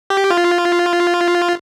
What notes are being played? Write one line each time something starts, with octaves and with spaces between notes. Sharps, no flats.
G4
F4